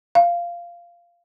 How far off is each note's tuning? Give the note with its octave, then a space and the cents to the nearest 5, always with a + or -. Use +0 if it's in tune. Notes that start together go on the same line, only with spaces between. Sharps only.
F5 -10